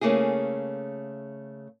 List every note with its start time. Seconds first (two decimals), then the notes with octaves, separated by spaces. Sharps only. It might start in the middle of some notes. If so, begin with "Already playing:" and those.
0.01 C#3 A3 A#3 E4 G#4